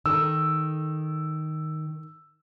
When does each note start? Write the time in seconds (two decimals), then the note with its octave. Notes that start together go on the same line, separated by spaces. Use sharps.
0.06 D#3 A4 E6